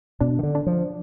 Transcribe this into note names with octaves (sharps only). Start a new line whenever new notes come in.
B2 D4
D#3
D3
D4
F3